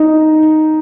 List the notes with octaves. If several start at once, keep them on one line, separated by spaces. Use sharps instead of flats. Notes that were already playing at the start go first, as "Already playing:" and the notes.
Already playing: D#4